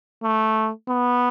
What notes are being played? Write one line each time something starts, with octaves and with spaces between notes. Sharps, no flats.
A3
B3